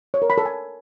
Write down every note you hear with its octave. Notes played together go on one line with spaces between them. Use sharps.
C#5
A#4
B5
A4
G#5